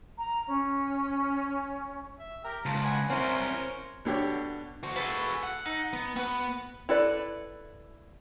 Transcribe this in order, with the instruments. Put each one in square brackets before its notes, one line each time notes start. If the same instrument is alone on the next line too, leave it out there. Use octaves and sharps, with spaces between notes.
[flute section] A#5
C#4
[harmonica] E5
G4 A#4
[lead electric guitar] C#2 [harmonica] A5
[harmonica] F#5 G#5 B5
[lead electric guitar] C4 E4 [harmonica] C#4 A#4 C5
[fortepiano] B2 D3 G4 C#5
[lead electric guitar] F#4 C5
[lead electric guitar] F#4 G#4 [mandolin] A4 B4
[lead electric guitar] F#5
[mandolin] D#4
[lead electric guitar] B3
[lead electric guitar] B3 [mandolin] F#4 B4
[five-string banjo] E4 A4 B4 D5